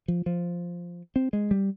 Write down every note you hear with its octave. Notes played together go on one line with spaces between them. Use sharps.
F3
F3
C4
G#3
G3